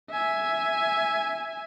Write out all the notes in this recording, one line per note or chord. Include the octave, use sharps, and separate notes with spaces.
E5 G#5